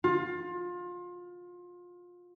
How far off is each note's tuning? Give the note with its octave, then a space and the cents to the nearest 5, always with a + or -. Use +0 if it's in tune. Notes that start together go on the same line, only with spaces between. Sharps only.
F4 +25